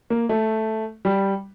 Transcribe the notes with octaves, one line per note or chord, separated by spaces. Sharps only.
A#3
A3
G3